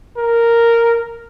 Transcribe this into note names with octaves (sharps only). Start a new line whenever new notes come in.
A#4